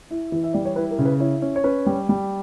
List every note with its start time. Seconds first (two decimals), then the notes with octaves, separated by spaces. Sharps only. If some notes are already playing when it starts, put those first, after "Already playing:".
0.11 E4
0.32 E3
0.44 E5
0.54 G3 D5
0.65 C#5
0.76 E4 B4
0.91 A#4
0.98 C#3
1.05 B4
1.20 E4 C#5
1.42 C#4
1.56 C#5
1.64 C#4 B4
1.86 G3
2.09 G3